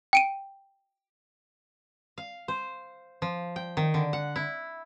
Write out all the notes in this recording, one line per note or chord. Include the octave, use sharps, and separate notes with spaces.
G5 D7 D#7
F5
C5
F3
G5
D#3
D3
F#5
E4